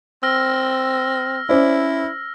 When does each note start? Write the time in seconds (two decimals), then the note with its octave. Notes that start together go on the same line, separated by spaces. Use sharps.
0.23 C4 E6 F6 A#6
1.49 C#4 E4 C5 D5